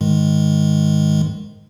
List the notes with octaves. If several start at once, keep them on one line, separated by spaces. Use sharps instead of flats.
G#2 D#3 G#3